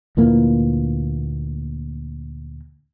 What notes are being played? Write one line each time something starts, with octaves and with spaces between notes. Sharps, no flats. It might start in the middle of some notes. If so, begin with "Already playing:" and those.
D2 A#2 E3 A#3